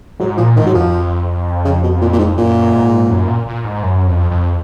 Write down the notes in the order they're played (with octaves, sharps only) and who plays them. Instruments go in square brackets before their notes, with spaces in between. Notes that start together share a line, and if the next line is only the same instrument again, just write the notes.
[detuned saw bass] G#2 [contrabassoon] F#3
[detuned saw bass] A#2 [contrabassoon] F3
[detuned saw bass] G#2 [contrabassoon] D#3
[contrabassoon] F#3
[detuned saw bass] F2 [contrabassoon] F3
[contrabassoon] C#3
B2
A#2
A#2
G#2
[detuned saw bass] F#2 [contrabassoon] A#2
[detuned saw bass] G#2
F#2
A#2
A#2
G#2
F#2
F2
F2